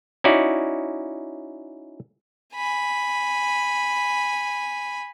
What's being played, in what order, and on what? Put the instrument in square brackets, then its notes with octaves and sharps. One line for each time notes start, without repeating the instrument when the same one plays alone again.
[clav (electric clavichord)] C#4 D#4 E4 F#4 D5
[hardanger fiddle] G#5 B5